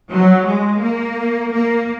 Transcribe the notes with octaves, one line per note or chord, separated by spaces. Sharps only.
F#3
G#3
A#3
A#3